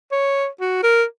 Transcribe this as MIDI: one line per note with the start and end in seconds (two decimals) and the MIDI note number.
0.12 0.47 73
0.60 0.79 66
0.83 1.04 70